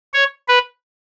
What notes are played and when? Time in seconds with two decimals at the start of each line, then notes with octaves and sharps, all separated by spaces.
0.14 C#5
0.49 B4